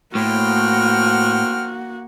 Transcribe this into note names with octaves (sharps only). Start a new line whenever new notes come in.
A2 A#3 F#4 C5 G5 F6